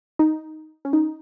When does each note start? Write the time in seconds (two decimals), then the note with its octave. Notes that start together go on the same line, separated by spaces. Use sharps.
0.19 D#4
0.85 C#4
0.93 D#4